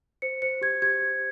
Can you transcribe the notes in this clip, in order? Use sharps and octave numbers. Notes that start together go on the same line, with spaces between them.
C5 C#7
C5 C#7
G4 G#6
G4 G#6
G4